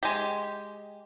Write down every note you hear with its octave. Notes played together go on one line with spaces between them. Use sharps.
G#3 G4